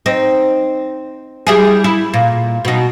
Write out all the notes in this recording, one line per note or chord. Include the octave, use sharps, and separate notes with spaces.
C4 D#4
G3 E4 G#4
E4
A#2
B2 D#4